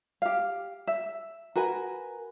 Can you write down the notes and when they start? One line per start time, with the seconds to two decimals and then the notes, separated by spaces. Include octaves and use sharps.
0.22 G4 F5
0.87 E5
1.56 F#4 A#4 B4 G#5